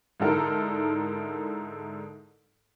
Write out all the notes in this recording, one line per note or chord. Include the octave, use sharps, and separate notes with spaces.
G#2 D3 D#4 E4 A4 A#4